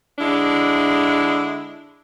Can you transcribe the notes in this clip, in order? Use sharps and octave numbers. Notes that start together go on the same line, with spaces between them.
D3 G#3 D4 E4